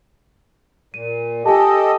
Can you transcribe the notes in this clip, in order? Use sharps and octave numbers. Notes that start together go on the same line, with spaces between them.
A#2 D#7
G4 A4 D#5 G#5 A5